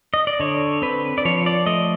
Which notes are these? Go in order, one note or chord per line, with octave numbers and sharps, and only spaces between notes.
D#5
D5
D3 C#5
C4 B4
D5
F3 C#5
D5
A3 D#5